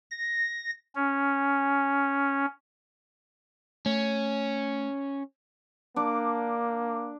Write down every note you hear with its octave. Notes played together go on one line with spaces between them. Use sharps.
A#6
C#4
A3 C#4
A#3 D4 D6